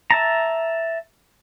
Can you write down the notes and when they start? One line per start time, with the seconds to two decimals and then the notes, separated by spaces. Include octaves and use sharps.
0.11 E5 A5 A#5